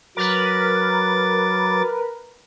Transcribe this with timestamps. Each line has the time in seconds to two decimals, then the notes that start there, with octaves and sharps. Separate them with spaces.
0.17 F#3 A#4 B4 D6 A6